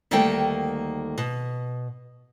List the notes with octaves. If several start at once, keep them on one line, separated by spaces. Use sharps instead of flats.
D2 D#3 G3 A3 A#3 G5
B2